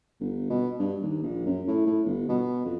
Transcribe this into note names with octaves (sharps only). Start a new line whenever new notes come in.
G1
B2
G2
D#2
A#1
F#2
A2
A2
G1
B2
F2